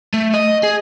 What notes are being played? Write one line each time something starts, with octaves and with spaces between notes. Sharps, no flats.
A3
D#5
G#4